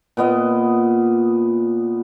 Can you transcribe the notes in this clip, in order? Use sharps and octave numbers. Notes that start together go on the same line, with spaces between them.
A#2 B3 D#5